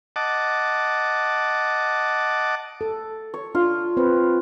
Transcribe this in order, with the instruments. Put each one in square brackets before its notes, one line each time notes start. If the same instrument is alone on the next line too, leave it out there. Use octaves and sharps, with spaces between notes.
[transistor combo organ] D#5 F#5 A5 D6
[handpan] A4
[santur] C#5
[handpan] D4 [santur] F4
[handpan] C4 B4 C5